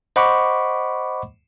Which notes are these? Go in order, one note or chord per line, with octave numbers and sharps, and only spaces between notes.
C5 D#5 F#5 B5 C#6 D6